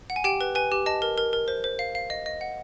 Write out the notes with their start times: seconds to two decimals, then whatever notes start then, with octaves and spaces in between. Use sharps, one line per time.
0.10 F#5
0.16 G#5
0.24 G4 G5
0.41 B4
0.55 B4 G#5
0.72 G4
0.86 D#5 A5
1.02 A#4
1.18 A#4
1.33 A#4
1.48 C5
1.64 C5
1.79 F5
1.95 F5
2.10 D#5
2.26 D#5
2.41 F#5